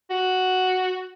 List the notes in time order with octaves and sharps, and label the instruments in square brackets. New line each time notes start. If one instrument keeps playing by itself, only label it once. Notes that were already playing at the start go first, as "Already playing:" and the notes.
[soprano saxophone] F#4